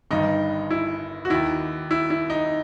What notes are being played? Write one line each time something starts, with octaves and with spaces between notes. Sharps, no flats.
G1 G2 D#3 D#4
E4
F#4
D#2 D#3 E4
E4
E4
D#4